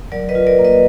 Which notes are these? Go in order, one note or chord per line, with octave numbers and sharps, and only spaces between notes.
F#3 A#4 D5
B4 D#5
F4
A#4 D5
A#3
B4 D#5